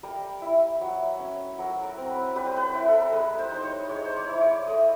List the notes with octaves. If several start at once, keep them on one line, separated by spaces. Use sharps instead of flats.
G3 A#4
E4
F#3
C#4
F#3 A#4
A#4
C4
B4
G3 B4
C5
B4
E4 A#4
A4
A#4
G#3 B4
C5
D#4 C5
C#5
G#3 C#5
C5
C#5
E4
C#5
D5
A3 D#5